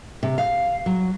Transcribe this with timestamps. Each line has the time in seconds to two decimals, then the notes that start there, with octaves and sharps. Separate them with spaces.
0.23 C3
0.38 F5
0.86 F#3